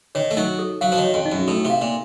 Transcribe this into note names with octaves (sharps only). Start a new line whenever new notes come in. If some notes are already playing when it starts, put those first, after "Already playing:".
D#3 C#5
A3
F#3 D#4
A4
F#3 F5
F3
D#3
C#5
F2
D#4
F#2
A2 A4
C3
F5
A#2